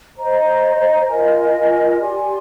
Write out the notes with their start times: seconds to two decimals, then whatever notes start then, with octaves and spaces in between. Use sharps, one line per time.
0.17 C5 D#5 A#5
1.07 F4 A#4 D#5 G#5
1.97 G4 D5 G#5 C6